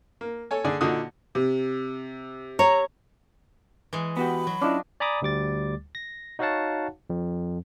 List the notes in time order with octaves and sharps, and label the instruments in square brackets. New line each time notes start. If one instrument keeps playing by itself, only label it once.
[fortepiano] A#3
A4 C#5 G#5
D3 G#4 D5
A#2 D3 D#4 F#4 D#6
[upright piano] C3
[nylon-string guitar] C#5 [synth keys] A#5
[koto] E3 G#3
[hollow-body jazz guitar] B3 F#4 G4 [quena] B5
[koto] F#3
[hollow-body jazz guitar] C#4 E4 [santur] D4 F4 D#5
[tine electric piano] D5 G#5 A#5 B5 D6 D#6
D2 G3 D6 A6
A#6
D#4 F#4 C#5 F5 F#5 A5
F2